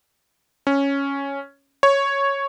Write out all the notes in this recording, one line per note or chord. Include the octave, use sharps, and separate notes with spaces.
C#4
C#5